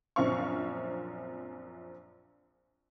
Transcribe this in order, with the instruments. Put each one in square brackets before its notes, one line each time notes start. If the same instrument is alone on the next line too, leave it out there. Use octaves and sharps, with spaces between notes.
[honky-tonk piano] A#1 F#2 C4 F5 C#6